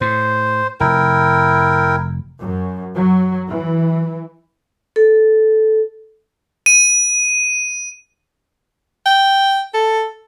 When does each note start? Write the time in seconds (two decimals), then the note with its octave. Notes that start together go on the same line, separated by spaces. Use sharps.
0.01 A2 C5
0.80 F1 E4 A#4 G5
2.38 F#2
2.95 F#3
3.48 E3
4.96 A4
6.66 D#7
9.06 G5
9.74 A4